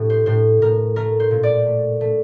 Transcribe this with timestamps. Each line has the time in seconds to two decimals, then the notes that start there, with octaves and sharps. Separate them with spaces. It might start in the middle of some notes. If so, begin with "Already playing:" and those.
Already playing: A2 G4
0.10 C5
0.26 A2 C5
0.62 A2 A#4
0.96 A3 A#4
1.20 C5
1.31 A#2
1.43 D5
1.66 A3
2.01 A3